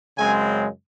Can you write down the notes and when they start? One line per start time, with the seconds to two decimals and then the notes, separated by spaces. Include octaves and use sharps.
0.18 F#2 C#3 G#3 C4 G#5